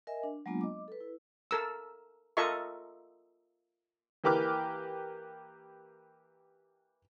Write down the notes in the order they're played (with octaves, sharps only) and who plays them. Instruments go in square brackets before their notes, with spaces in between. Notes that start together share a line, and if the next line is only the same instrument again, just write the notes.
[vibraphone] A#4 D#5 E5 G#5
D4
F#3 G#3 A#3 B3 D4 F4
D#5 D6
A4 B4
E4
[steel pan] A4 A#4 E6
F4 A4 A#4 D#5 E5 C#6
[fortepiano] E3 A#3 G4 B4 D6 F6